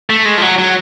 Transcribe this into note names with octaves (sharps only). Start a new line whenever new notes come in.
A3
G#3
F3
F#3
F#3